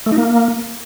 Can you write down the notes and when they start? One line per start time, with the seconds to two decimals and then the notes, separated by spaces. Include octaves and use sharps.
0.06 A3
0.12 D#4
0.18 A#3